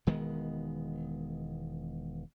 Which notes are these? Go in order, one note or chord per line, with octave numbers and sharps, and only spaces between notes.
E1 D#3 G#3 B3